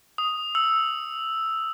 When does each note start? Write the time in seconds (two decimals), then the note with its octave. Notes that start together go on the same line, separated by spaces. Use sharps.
0.18 D#6
0.55 E6